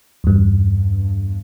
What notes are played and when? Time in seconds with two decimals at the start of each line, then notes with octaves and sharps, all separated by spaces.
0.24 E2 G2